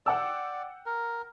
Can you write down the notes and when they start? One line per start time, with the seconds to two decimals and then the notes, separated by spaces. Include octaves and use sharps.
0.06 D5 F#5 G5 E6
0.86 A#4